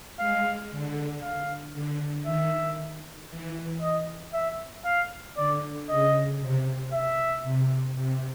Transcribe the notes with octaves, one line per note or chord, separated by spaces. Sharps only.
G#3 F5
D3
F5
D3
D#3 E5
E3
D#5
E5
F5
D3 D5
C#3 D#5
C3
E5
C3
C3